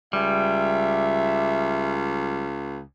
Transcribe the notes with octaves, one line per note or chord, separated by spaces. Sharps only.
C#2 G3 E5